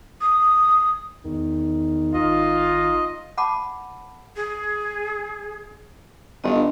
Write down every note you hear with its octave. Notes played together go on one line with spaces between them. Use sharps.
D#6
E2 D#3
G#1 D#4 F4 D#5
F#5 A5 B5 D6
G#4
G1 D4 D#5